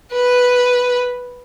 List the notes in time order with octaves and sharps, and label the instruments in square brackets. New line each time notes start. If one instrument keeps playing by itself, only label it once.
[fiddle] B4